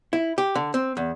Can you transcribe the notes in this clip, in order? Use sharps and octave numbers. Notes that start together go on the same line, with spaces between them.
E4
G4
D3
C4
E2